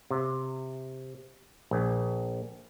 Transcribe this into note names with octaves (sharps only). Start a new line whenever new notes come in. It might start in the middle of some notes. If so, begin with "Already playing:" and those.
C3
A#1